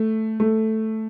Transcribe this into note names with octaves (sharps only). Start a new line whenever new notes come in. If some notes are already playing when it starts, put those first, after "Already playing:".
Already playing: A3
A3